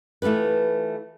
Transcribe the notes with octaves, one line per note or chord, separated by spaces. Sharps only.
E3 A3 F4 G4 B4